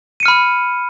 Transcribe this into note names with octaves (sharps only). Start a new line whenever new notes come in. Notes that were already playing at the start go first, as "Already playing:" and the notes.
B5 F6 C#7 D#7